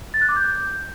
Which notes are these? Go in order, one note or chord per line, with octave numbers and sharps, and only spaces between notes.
A6
F#6
D6
G6